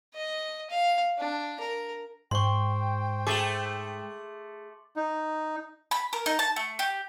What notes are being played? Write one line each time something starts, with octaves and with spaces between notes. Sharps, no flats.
D#5
F5
D4
A#4
G#2 C5 G5 C6 C#6
A3 G#4 D6 A6 F#7
D#4
B5
A#4
D#4
A5
A3
G4